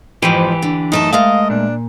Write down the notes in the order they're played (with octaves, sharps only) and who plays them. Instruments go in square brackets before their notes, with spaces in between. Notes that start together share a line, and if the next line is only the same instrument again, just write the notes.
[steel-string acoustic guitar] F2 G#2 F3 [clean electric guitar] E3 G4 B4
[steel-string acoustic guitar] D3
[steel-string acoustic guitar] F#2 A3 A5 [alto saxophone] D#4
[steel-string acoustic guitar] G#3 A3 A#4 [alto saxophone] D#5 [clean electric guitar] F5
[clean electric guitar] A#2 [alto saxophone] D4